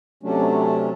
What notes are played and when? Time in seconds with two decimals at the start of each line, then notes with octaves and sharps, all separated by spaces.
0.23 C3 F#3 A3 C#4 D4